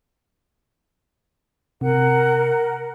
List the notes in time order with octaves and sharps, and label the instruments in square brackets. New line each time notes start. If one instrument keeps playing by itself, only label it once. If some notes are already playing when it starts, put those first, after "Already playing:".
[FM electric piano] C3 [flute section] A#4 F#5